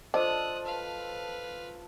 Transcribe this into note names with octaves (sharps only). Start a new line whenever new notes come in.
F3 D4 F4 A4 C5 D#5 D#6 F#6
B4 F5